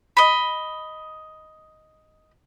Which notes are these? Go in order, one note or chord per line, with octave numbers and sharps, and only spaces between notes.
D#5 B5